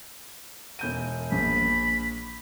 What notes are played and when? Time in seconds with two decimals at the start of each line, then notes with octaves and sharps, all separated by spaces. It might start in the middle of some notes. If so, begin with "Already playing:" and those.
0.79 E1 G6 D#7
1.32 A#1 B5